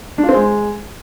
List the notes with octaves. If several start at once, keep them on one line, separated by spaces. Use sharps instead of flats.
D4
F4
C4
G#3